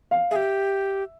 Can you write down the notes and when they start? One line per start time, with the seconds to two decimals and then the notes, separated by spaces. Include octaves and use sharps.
0.11 F5
0.31 G4 G#4 E5